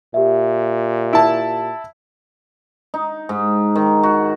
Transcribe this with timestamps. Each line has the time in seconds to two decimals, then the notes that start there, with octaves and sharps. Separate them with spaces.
0.14 A#2 G4 E5
1.13 E4 A5
2.94 D#4
3.29 G#2
3.76 D#3
4.03 F#4